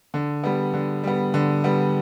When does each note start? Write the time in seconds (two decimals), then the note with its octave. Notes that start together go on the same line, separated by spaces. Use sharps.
0.14 D3
0.44 G3 B3
0.74 D3
1.04 G3 B3
1.34 D3
1.64 G3 B3